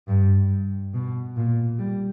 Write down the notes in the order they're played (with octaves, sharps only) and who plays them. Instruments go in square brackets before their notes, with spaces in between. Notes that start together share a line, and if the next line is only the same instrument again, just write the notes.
[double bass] G2
B2
A#2
G3